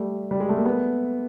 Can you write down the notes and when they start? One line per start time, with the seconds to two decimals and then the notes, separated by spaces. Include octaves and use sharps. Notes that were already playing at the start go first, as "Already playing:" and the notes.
Already playing: G3 A3
0.31 G3
0.40 G#3
0.49 A3
0.57 A#3
0.65 A3 B3